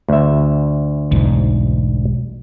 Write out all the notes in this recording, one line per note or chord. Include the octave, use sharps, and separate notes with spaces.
D2 E5
B1 E2 G#2